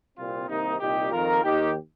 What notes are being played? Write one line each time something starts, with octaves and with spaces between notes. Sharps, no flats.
C2 A#2 C4 F4
C2 C3 D#3 A#3 D#4
C2 A#2 D#4 G4
F2 D#3 F4 A#4
D#2 D#3 D#4 G4